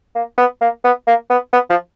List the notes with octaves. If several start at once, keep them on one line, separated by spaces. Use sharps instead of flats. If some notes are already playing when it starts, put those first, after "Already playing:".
A#3
B3
A#3
B3
A#3
B3
B3
F3